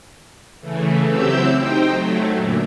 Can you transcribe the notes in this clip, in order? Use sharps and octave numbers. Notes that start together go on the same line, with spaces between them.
C#3 E3 A3
F#3 C4 E4 G4 E6 G6
D#4 C5 G5
F#3 A3
F#2 A#2 D3